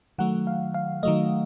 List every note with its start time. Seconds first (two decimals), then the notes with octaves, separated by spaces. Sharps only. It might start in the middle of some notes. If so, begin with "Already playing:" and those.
0.18 D#3 F#3 A3 F#5
0.47 F5
0.74 F5
1.03 D#3 F#3 A3 D#5